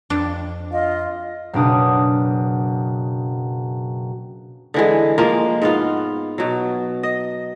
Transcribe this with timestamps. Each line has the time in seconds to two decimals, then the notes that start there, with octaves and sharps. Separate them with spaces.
0.10 F2 D4
0.72 F4 D#5
1.53 F#1 B2 D4 D#6
4.74 D3 E3 G#3
5.18 F3 G#3 A#3
5.62 G#2 B3 F4
6.38 B2 F#3
7.03 D#5